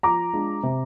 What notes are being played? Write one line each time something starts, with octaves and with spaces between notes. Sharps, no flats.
F3 A#5 D6
G#3 D4 F4
C3